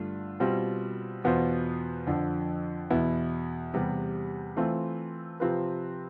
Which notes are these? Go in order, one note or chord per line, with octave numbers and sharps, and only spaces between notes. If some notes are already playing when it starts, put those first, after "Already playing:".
Already playing: G2 D3 A3 D4 F4
B2 G3 C4 F4
E2 B2 B3 F4 C5
F2 D3 F3
E2 B2 B3 E4
E2 C3 G3 B3
E3 A3 C4 F4
C3 F3 C4 F4 B4